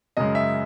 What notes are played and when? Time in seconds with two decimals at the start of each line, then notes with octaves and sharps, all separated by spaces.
0.17 F#2 C#3 G#3 D#5
0.35 E5